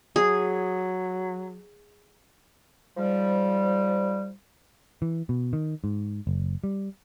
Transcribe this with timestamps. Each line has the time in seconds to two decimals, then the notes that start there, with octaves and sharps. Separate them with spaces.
0.16 F#3 G#4
2.97 G#2 F3 G3
5.02 E3
5.29 B2
5.53 D#3
5.84 G#2
6.27 F#1
6.64 G3